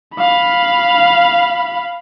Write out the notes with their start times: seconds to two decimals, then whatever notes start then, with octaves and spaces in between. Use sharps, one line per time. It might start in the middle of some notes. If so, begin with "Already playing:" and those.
0.16 F5 B5